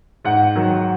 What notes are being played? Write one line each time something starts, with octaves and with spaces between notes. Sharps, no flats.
G#2 F#5
D#3 F#3